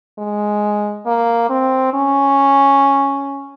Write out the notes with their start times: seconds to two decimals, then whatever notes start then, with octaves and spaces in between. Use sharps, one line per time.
0.18 G#3
1.06 A#3
1.50 C4
1.93 C#4